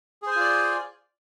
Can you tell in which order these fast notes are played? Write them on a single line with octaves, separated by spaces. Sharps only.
G#4 C5 G#5 F4 D5